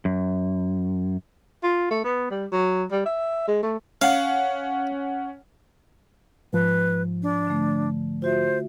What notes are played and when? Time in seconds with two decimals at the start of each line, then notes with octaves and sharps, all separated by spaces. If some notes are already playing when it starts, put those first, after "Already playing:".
0.05 F#2
1.63 F4
1.91 A3
2.04 B3
2.30 G3
2.52 F#3
2.91 G3
3.05 E5
3.48 G#3
3.63 A3
4.01 C#4 F5 F#5
6.53 G#2 F3 B4
7.22 D4
7.47 D3 A3
8.22 F4 F#4 C5 E5